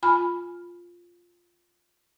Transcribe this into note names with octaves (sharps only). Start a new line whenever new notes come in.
F4 G#5 B5 F6